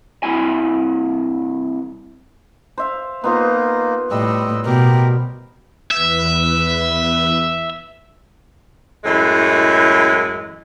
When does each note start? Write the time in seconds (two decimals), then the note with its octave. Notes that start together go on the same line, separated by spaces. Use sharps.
0.23 G2 C3 A#3 D#4 E4 G#5
2.78 C5 E5 F5
3.24 A#3 B3 D#4 F4 C5
4.11 A2 G3 D#5 E6
4.65 B2 G4 A#4
5.91 E2 B4 E5
9.04 F#2 A2 E3 G#3